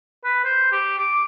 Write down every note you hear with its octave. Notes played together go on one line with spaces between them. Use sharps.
B4
C5
G4
D6